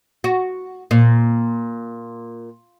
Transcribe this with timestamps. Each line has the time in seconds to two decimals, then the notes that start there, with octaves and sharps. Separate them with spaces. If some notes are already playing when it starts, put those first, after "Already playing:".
0.24 F#4
0.91 A#2